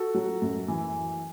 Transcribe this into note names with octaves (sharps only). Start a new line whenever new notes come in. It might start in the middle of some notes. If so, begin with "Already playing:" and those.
Already playing: F#4 A4
F#3
F#2
E3